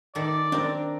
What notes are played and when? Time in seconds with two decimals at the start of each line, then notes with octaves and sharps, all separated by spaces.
0.15 D#3 A4 D5
0.52 C4 D4 A#4